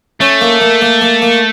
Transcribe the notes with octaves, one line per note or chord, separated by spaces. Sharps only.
A3 C#4
A#3
A#3
A#3
A#3
A#3